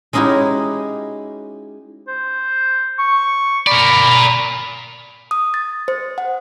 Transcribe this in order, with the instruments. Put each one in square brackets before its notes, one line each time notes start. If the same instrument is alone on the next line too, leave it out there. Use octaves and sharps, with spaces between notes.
[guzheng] G#3 C#4 D#4 E4 F#4 G4
[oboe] C5
C#6
[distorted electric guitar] A#4 D5 [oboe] B5
[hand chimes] D#6
A6
C5
F#5